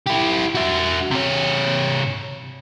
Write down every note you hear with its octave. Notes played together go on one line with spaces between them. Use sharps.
E4 G4
F#4 E5
C3 C#5